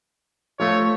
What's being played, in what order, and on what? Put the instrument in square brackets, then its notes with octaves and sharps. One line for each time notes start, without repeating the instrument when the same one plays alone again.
[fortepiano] F3 A3 [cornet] C#5